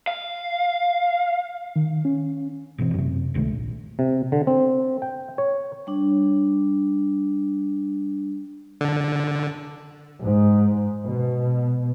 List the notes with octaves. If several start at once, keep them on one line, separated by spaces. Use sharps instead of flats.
F5
D#3
C#4
G1 B2 E3 C4
F#2 C3
F#1 C#2 D#3 A3
A#1
C3
D3
C4
G5
C#5
G3 D4
D3
G#2
B2